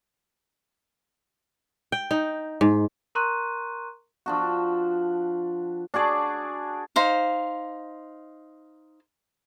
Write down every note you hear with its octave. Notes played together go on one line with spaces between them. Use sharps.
G5
D#4
G#2
A#4 A#5 C6 C#6 F#6 D#7
F3 D4 F#4
D4 F#4 G#4 D5
D#4 C5 F5